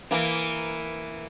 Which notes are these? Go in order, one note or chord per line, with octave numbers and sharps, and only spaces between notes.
E3 A#3